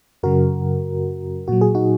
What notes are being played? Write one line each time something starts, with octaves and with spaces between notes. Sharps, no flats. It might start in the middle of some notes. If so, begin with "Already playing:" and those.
F#2 C#3 F#3 F#4 A#4
A#2 F#3 F#4
G#4
D#4 F#4